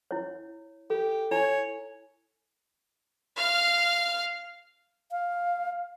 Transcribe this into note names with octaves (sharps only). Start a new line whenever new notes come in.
E4 C#5
G4 A4
E4 C#5 G#5
F5 F6
F5